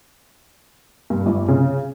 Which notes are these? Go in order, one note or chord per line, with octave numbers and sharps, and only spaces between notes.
G2
G1
C#3